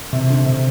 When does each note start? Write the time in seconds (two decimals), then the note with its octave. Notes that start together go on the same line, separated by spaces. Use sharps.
0.13 C3
0.30 D3
0.46 C3